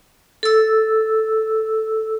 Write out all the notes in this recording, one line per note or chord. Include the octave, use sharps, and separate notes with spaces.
A4 E6